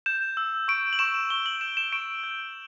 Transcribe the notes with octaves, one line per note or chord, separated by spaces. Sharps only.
G6 E7
E6
C#6 D7
F#7
C#6 E7
C#6 G7
F#7
G6 E7
E7
C#6 D7
G6